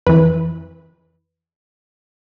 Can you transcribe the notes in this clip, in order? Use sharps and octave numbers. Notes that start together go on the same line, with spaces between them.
F2 E3 B4